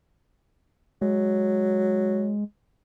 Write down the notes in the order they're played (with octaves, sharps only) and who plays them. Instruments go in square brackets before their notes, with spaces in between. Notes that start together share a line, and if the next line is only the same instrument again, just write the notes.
[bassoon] F#3 [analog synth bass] G#3